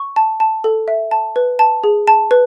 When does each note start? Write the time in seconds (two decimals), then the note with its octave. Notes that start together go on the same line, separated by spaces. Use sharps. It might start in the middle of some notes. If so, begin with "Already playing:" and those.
Already playing: C#6
0.16 A5
0.40 A5
0.64 A4
0.88 E5
1.11 A5
1.36 B4
1.59 A5
1.84 G#4
2.07 A5
2.31 B4